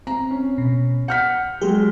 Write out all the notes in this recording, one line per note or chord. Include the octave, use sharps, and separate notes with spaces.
C4 A#5
C#4
B2
F#5 F6 G6 B6 C#7
F#3 G#3 G4